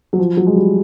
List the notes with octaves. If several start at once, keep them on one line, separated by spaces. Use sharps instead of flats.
F#3
F3
F#3
G#3
G3